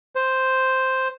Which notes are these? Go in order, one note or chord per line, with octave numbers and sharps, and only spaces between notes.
C5